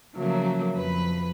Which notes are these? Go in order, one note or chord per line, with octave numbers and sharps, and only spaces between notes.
C#3 F3 F#3 A3 A#3
F2 B4 B5